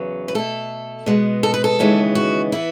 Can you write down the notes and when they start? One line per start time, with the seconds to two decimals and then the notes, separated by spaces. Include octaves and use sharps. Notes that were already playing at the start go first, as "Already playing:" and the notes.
Already playing: E2 C#3 F#3 B3
0.28 B4
0.35 B2 A3 A4
1.06 B2 G#3 B3
1.43 A4
1.54 B4
1.64 A4
1.79 D#2 C#3 E3 G#3 B3
2.15 F#4
2.52 E3 B3 E4